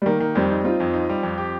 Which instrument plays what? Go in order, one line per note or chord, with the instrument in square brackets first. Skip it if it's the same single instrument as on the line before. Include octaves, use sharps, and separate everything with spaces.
[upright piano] G3
[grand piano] D#3 [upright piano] A#3
[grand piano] D#3
[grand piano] F2 [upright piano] G3 C4
[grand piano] D#4
[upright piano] C4 F4 [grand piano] D#4
[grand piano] F2
D#4
G3
F2
G4